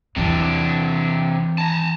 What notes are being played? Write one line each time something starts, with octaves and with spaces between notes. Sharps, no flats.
E2 C3 E3 D4
A5 A#5